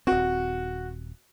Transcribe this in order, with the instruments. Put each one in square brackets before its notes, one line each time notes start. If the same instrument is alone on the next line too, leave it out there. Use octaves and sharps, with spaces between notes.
[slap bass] D#1 C4 [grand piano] F#4